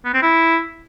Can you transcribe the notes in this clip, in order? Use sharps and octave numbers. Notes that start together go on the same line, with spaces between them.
B3
C4
E4